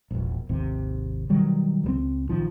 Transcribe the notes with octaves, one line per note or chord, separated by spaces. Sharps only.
E1 A#1
G#1 D#2 C3
B2 D#3 F#3 G3
C#2 G3 C4
A#1 D#3 F3